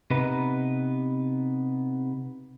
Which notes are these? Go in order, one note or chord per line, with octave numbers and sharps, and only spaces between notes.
C3 B3 D#4 B4